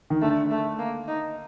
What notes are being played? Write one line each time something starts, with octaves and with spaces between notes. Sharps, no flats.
D#3
D3 A3
A3
A#3
D#4